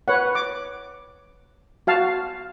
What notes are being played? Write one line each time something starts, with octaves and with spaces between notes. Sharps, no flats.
B4 C#5 F#5
D6
F#4 F5 A5